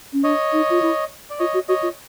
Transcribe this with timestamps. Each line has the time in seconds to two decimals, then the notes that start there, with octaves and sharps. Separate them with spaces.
0.13 C#4
0.24 D4 C#5 D#5
0.53 D#4
0.70 F4
0.82 E4
1.30 D5
1.39 F4 C#5 D#5
1.54 F#4
1.68 F#4 C#5 D#5
1.83 F4